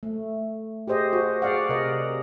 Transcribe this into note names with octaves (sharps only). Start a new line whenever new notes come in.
A3
G4 G#4 C5 D#5
F#4
G#4 D5 F5 F#5
C3 A#4 D#5